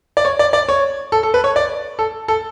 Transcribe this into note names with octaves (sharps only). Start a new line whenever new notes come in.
D5
C#5
D5
D5
C#5
A4
A4
B4
C#5
D5
A4
A4